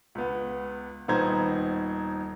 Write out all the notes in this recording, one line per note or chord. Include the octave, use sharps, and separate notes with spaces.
C#2 B3
D#1 D#3 B3 C5 A#5 G#6